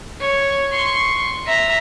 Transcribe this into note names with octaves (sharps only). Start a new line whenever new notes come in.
C#5
C6 C#6
E5 A#5